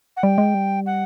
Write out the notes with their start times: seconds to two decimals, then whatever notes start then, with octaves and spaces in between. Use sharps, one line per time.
0.17 F#5
0.23 G3 G5
0.38 G#3
0.55 G3
0.86 F#5